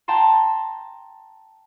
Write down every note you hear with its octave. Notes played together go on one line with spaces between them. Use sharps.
G5 A5 A#5 C6